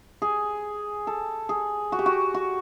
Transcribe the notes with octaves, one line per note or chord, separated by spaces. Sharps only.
G#4
A4
G#4
F#4
G4
F#4
F#4